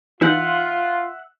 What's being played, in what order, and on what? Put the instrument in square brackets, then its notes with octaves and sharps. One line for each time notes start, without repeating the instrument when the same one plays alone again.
[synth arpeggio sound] E3 D#4 [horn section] F4 [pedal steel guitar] E5 F#5